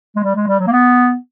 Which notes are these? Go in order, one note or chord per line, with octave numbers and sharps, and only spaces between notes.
G#3
G3
G#3
G3
F#3
A#3
B3